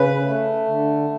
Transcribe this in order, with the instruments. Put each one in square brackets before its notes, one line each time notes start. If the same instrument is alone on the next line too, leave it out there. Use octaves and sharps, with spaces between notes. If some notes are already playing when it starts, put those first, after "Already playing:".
Already playing: [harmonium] C#3 B4
A3
D3